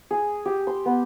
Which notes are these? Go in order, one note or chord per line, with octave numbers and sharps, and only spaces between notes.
G#4
G4
C6
B3